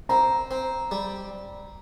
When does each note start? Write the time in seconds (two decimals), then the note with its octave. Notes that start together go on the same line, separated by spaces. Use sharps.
0.09 C4 A#5
0.51 C4
0.91 G3